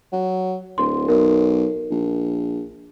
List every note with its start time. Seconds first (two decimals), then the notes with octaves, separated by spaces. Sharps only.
0.13 F#3
0.78 D1 C6
1.08 B1 A#4
1.91 A#1